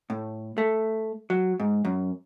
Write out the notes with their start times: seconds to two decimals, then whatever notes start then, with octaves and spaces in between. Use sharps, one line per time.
0.10 A2
0.58 A3
1.30 F#3
1.60 G#2
1.85 F#2